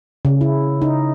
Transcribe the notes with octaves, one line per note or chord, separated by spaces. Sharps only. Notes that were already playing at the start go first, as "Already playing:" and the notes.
C#3
E4
D#4